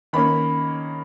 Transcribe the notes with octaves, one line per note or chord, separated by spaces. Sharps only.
D#3 A#3 C#4 B5